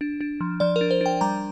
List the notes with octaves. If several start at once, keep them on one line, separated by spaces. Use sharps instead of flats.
D4
D4
F3
F3 D5
A#4
D4
C5
D4 G5
G3 A#5